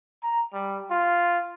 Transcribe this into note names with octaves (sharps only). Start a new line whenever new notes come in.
A#5
G3
F4